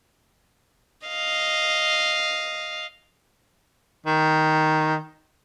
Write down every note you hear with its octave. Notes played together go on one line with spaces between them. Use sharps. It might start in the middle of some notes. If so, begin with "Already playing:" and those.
D#5 F5
D#3